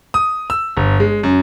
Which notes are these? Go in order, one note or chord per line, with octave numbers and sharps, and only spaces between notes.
D#6
E6
G1
G#3
F#2